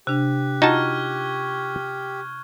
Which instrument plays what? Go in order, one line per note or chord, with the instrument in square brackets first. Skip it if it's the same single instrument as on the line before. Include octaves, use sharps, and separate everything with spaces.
[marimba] C3 D4 [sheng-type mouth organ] G4 [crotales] F#6
[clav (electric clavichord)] D#4 F#4 A5 [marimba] F4 A#5 [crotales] C#6 F6 G#6